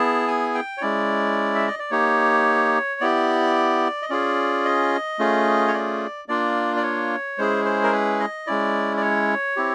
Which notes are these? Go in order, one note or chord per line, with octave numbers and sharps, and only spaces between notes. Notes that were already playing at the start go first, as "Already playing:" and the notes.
Already playing: B3 E4 G#4 A5
G#5
G5
C#5
G#3 C#4 E4 D5
E5
D#5
D5
A#3 D#4 G4 C#5
B3 E4 G4 D5
D#5
C#4 F4 G#4 D5
D#5
A3 C#4 F4 G#4
C#5
D5
A#3 D4 F4 D5
D5
C#5
G#3 C#4 E4 G#4 C5
C5
A#4
B4
D#5
G#3 C#4 E4 D5
D5
C#5
C4 E4 G4